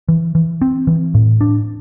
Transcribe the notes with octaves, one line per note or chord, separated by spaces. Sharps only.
E3
E3
C4
E3
A2
D4